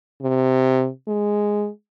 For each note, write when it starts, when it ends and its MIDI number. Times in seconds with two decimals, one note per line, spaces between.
0.22 0.88 48
1.08 1.68 56